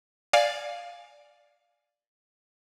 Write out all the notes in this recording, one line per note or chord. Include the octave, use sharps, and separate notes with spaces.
D5 F5 G#5